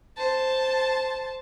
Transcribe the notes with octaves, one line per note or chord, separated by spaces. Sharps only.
C5 A5